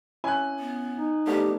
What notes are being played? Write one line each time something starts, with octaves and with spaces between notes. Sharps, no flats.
C#4 E4 G#5 F#6
B3
D#4
A3 B3 D4 G4